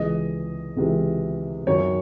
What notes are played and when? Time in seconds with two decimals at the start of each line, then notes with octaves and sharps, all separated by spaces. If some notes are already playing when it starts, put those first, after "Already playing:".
Already playing: C#2 C3 E3 D#5
0.77 C#2 C3 E3
1.67 F#2 D#3 F#3 C#5